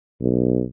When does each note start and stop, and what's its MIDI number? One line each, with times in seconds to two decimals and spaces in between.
0.21 0.62 35